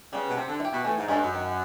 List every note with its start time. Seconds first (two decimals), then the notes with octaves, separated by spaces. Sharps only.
0.13 C#3 G3 B3
0.29 B2
0.37 C3 C4
0.48 D3
0.60 E4 G4
0.73 B2
0.84 A2 E3
0.97 G#2
1.08 G2 G#3 C#4 F#4 A4
1.21 F#2
1.33 D#3